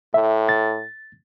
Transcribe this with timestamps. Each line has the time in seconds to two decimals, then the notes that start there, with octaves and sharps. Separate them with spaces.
0.14 A2 E5
0.49 A6